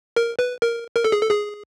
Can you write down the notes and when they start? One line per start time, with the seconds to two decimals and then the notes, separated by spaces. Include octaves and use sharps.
0.16 A#4
0.39 B4
0.62 A#4
0.96 A#4
1.04 A4
1.12 G#4
1.22 A4
1.31 G#4